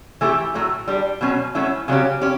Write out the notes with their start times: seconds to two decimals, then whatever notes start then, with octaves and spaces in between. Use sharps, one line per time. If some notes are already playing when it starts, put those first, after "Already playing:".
0.21 E3 A3 E4 G4
0.54 A2 F#3 A3
0.88 G3 D4 G4
1.21 B2 F#3 C#4
1.55 F#3 A3 C#4 E4
1.88 C#3 F#3 C#4 G4
2.22 C#4 G4